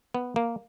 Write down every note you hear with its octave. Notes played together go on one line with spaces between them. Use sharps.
B3
A#3